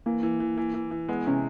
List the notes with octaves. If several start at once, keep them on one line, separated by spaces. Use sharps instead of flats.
E3 A#3
E3
E3
E3
E3
E3
G#3 B3
C3 C#4